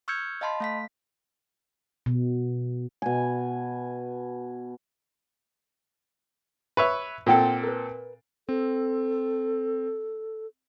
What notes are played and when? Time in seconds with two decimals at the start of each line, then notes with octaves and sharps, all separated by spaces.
0.08 C#6 E6 F6 G6 G#6 C#7
0.41 D#5 F5 A5 B5 C6
0.60 A3 F5 B6
2.06 B2
3.02 B2 G#5
6.77 B4 C#5 E5
7.26 A#2 C4 A4 C5 F#5 G5
7.63 A#4 B4
8.49 C4 A4